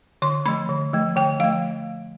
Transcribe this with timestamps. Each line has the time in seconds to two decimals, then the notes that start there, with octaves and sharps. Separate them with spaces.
0.22 D3 C6
0.46 F3 A3 B5
0.69 D3
0.93 F3 A3
1.16 D3 G5
1.40 F3 A3 F5